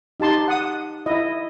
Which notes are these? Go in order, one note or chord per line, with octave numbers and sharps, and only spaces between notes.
D#4 G4 A5 C6
F#5 D#6
E4 D#5